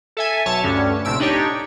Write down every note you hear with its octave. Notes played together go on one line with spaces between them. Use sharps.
A4 E5 G#5
B1 C#5 A5
D2 G2 D3 C#4
A#1 A2 C3 E6 D7
D4 D#4 G4 C#5